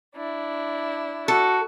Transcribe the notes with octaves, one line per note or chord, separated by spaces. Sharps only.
D4 E4
F#4 A4